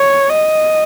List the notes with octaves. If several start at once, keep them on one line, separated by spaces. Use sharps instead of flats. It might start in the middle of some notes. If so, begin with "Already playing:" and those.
Already playing: C#5
D#5